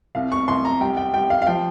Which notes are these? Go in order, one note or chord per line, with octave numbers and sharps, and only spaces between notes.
C2 F5
C#6
C2 C6
A#5
G3 G5
G5
G3 G5
F5
F5
F3 G5